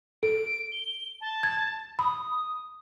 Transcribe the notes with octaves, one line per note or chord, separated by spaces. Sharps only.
A4 D7
G7
A5
G#6
B5 D#6